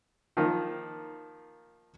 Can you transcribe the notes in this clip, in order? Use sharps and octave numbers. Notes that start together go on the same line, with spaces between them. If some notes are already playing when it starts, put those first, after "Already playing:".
D#3 F3 A#3